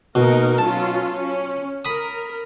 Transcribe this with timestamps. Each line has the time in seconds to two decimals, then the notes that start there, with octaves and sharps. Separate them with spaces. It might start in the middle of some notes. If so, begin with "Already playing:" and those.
0.15 B2 A#3 D#4 A#4
0.58 F#3 C#4 F4 A5
1.13 C#4
1.85 A#4 B5 D#6